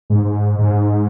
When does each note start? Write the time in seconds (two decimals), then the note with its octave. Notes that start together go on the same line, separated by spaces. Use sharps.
0.10 G#2
0.59 G#2